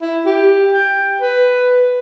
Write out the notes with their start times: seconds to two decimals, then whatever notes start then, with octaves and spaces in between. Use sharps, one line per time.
0.02 E4
0.26 G4
0.72 G5
1.21 B4